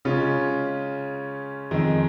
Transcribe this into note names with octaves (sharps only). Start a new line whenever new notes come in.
C#3 G#3 C#4 F4
F2 D#3 G#3